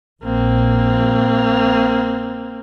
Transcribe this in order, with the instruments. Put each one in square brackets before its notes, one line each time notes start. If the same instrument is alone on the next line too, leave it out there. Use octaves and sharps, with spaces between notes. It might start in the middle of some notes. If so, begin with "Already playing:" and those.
[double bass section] A#1 [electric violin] A#3 C4